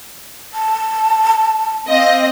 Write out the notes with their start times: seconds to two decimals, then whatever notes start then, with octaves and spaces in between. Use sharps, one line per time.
0.54 A5
1.88 C4 D#5 F5